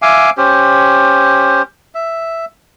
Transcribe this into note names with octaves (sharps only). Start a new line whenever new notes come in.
E5 F5 G#5 D6
C#4 G4 C5
E5